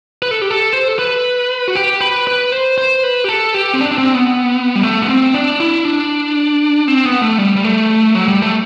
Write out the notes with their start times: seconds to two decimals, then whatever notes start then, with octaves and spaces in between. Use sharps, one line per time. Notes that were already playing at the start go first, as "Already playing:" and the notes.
0.22 B4
0.31 A4
0.42 G4
0.51 A4
0.73 C5
0.88 A4
0.99 B4
1.68 F#4
1.75 G4
2.01 B4
2.27 B4
2.52 C5
2.78 C5
3.03 B4
3.24 G4
3.29 A4
3.54 G4
3.74 C4
3.81 D4
3.91 D4
3.98 C4
4.14 B3
4.75 G3
4.83 A3
5.02 B3
5.08 C4
5.34 D4
5.60 E4
5.85 D4
6.88 C4
7.05 B3
7.22 A3
7.38 G3
7.56 G3
7.64 A3
8.15 F#3
8.28 G3
8.42 A3